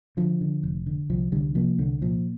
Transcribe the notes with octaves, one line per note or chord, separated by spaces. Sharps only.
D3 F3
D3
F1
D3
C2 F3
C2 D3 G3
C3 F3 A#3
C2 D3
A#2 F3